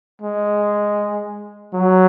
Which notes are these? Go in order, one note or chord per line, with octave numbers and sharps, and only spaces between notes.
G#3
F#3